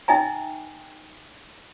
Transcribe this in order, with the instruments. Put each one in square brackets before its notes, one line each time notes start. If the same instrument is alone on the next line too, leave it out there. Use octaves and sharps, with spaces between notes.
[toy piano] D#4 E5 G5 G#5 A#5